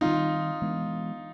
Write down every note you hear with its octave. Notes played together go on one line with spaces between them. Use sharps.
D#3 G3 C4 D#4 F4
E3 G#3 B3 D4